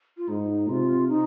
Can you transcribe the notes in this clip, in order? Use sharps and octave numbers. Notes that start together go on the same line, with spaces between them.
F4
G#2 D#4
C3 F4
D#4